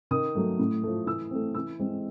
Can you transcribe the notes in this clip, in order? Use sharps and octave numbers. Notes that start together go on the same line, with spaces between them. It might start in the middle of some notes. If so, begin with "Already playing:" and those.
D#3 D#6
F#3 A3
A2
F3 A3
E3 E6
A3 C4
E3 E6
G#3 C4